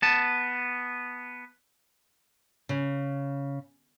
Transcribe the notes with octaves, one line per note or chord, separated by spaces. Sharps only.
B3 A5
C#3